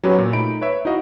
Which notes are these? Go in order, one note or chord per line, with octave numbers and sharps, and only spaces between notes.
F#3 C#4 F#4 G4 B4 C#5
A#2
A3 D#4 B5 D7
B4 C#5 E5
D#4 E4 F#4 D#5 F5